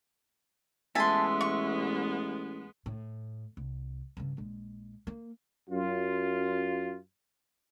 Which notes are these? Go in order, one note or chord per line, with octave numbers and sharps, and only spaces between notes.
A1 G#3 B3 E5 G#5 A5 C6
C#6
A2
C2
G2 C#3
A#1 G#3
A#3
F#2 F4